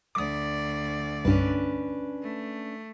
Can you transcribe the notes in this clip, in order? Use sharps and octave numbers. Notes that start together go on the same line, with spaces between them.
D2 D5 D6 D#6
C2 G2 C#4 D4 B4
A3